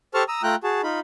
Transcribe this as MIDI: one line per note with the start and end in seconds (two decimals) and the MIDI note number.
0.14 0.24 67
0.14 0.24 69
0.14 0.24 72
0.14 0.24 81
0.14 0.24 85
0.14 0.24 89
0.28 0.42 82
0.28 0.42 87
0.28 0.42 88
0.43 0.55 57
0.43 0.55 65
0.43 0.55 79
0.43 0.55 82
0.43 0.55 90
0.64 0.81 66
0.64 0.81 68
0.64 0.81 81
0.83 1.00 63
0.83 1.00 65
0.83 1.00 83